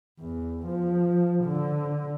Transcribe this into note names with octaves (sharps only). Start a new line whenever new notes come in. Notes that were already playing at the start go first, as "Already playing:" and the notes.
E2
F3
D3